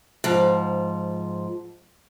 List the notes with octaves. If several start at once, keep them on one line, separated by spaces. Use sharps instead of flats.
G#2 F3